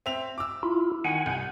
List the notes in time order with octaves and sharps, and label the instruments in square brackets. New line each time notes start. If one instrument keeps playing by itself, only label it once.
[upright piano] C4 E5 F7
D6 E6
[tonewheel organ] E4 F4
[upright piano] D#3 [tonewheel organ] F#5 G#5
[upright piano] C2